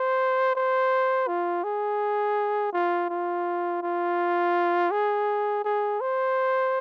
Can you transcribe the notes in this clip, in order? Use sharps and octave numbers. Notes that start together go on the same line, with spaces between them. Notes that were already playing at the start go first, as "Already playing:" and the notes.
Already playing: C5
C5
F4
G#4
F4
F4
F4
G#4
G#4
C5